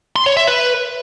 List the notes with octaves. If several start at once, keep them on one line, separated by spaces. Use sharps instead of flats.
C6
C#5
E5
B4